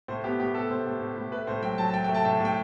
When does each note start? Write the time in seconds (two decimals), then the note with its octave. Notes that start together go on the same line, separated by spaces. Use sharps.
0.08 A2 C5
0.24 B3 G4
0.39 A2 G4
0.54 B3 A4
0.70 A2 C5
0.86 A2
1.01 A2
1.17 A2
1.32 A3 B4
1.47 A2 C5
1.62 F#3 G5
1.78 F#3 A5
1.89 A5
1.94 F#3 G5
2.04 G5
2.09 A3
2.14 A5
2.25 A2 G5
2.40 A2 G5